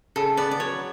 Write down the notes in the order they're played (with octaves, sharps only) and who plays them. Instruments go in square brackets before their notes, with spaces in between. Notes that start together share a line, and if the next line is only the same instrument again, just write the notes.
[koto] C#3 [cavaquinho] A4
[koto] B3 [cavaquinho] D5
[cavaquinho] D5
[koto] F#3 [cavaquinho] C#5